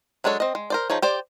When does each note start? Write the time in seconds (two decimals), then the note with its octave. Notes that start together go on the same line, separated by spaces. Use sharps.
0.24 F#3 G#3 D4 A4 C#5
0.40 C4 D#5
0.55 G#3
0.70 A#4 C5 D5
0.90 F3 D#4 G#4 C#5
1.02 G4 C5 D5